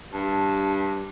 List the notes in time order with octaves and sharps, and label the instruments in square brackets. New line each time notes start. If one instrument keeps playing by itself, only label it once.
[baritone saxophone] G2 [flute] A5